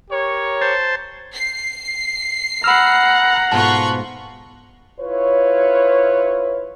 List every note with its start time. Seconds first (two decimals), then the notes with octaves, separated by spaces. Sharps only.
0.11 G4 A#4 C#5
0.61 C5 A5
1.34 C7
2.64 F#5 A#5 B5 E6 F6
3.52 G#2 B2 A3 F4 A5 B5 C#6 F#6
5.00 E4 F4 B4 C#5